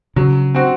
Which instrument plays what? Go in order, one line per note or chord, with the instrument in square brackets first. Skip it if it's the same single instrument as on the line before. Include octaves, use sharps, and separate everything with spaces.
[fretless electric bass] C#3 [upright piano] F#3
[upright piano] C4 F#4